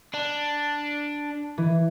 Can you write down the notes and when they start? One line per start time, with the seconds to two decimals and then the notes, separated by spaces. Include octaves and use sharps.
0.14 D4
1.58 E3